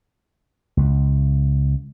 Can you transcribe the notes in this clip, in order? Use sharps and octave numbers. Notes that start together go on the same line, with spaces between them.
C#2